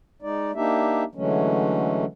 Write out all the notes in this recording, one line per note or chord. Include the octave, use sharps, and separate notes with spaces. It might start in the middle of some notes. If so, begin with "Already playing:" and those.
G#3 D#4 D5
A#3 D4 D#4 G4 E5
D3 E3 F#3 G#3 A3 C#4